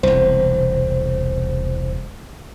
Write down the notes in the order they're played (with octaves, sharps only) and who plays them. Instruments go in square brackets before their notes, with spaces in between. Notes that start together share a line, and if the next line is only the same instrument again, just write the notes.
[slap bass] E1 C2 [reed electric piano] C5